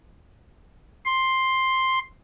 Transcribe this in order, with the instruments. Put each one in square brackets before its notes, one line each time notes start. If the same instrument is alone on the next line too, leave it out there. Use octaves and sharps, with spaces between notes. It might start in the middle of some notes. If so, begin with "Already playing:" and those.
[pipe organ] C6